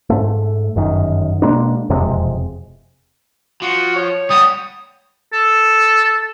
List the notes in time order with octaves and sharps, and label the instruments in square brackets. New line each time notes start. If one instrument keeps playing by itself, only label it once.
[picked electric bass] G#2 A3
G1 F#2 D#3
B2 G#3 A#3 D4
E1 F2 C3 G#3
[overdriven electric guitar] F3 [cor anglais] F#4
[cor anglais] C#5
[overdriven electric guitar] G3 F#4 [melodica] D#6
[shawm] A4